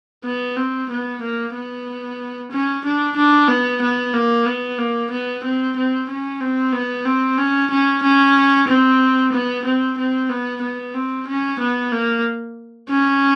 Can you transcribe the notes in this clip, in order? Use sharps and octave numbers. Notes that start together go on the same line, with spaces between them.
B3
C4
B3
A#3
B3
C#4
D4
D4
B3
B3
A#3
B3
A#3
B3
C4
C4
C#4
C4
B3
C4
C#4
C#4
C#4
C4
B3
C4
C4
B3
B3
C4
C#4
B3
A#3
C#4